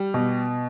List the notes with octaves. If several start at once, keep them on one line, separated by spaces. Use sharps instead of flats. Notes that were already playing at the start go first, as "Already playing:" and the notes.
Already playing: G3
B2